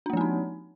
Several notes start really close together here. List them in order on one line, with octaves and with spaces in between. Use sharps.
D4 A#3 F3 C4 D#4